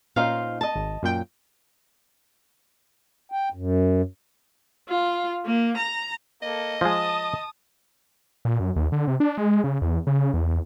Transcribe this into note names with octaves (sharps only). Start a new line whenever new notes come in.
A#2 C#4 D#4 F4 C5 F5
D#5 A5
G#1
F#2 A#2 G5
G5
F#2
F4
A#3
A#5
A#3 A4 D#5
F3 G#3 A5 D#6
A#2
F#2
D#2
D3
C3
D4
G#3
C#3
E2
C#3
E2